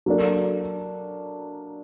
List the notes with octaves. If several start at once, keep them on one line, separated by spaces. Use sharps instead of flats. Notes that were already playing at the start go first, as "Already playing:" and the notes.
F#3 A#3 D4 A4